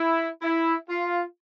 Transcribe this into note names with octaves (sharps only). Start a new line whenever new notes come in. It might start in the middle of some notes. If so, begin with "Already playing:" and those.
Already playing: E4
E4
F4